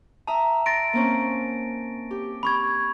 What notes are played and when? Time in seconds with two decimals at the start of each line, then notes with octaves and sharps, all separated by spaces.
0.27 E5 A5 A#5 D#6
0.66 C6 A6 A#6 D7
0.93 A#3 C4 C#4
2.11 G4
2.43 B5 C#6 G#6